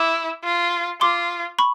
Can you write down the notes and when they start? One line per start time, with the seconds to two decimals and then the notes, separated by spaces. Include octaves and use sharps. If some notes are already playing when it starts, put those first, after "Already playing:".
Already playing: E4 D6 E6
0.44 F4
1.01 F4 C6 D6
1.59 B5 C#6